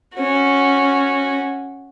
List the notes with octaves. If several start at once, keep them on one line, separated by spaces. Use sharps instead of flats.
C#4 F#4